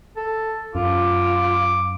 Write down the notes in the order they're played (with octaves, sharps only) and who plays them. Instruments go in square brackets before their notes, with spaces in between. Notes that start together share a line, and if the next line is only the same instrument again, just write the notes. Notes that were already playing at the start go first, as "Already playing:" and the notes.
[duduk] A4
[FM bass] F#2 [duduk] F4 [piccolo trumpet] D6